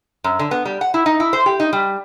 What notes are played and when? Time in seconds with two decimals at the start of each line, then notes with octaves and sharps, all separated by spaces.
0.24 F#2
0.39 D3
0.51 B3
0.65 G3
0.81 F#5
0.94 E4
1.06 D#4
1.20 E4
1.33 C5
1.46 G4
1.60 D#4
1.73 G3